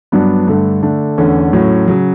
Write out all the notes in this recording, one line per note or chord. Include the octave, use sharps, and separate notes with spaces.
G2 F#3 B3 D4
G2 D3 A3
D3 A3 D4
E2 D3 A3 C#4
A2 F#3 C#4
C#3 F#3